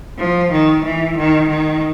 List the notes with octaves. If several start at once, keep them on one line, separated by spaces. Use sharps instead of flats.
F3
D#3
E3
D#3
D#3